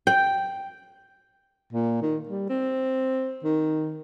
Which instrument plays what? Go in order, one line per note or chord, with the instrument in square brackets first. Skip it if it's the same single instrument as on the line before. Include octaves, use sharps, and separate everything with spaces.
[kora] G5
[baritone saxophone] A#2
D#3
G3
C4
D#3